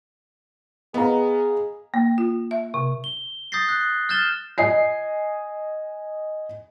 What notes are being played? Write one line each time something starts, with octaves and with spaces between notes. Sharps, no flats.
B3 G#4 D#5 F5 A#5
A#3
F4
E5
C3
G7
D#6 G6 A6 A#6 C7
F#6
F6 G6 A6 E7 G7
D#5 G#5 C7